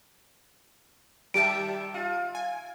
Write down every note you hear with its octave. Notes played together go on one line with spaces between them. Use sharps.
D#3 G3 G4 E5 A5 D7
F4
G#5